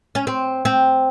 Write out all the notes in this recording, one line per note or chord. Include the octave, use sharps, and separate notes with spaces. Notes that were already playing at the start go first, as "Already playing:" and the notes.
C#4
C4
C4